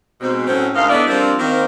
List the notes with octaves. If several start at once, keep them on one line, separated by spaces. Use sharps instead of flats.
G#2 B2 C4
A2 F#3 C4 C#4
D2 G#2 A#3 D#4 F5
A3 B3 D4 E4 D5 D#5
F3 G3 A#3 C4 D4
D#3 A#3 C4